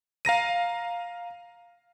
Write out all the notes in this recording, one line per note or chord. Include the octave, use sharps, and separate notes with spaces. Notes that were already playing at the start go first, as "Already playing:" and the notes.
F5 A#5 A#6 D#7